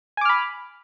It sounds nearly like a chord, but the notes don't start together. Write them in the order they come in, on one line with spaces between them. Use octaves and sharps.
G#5 D6 F6 B5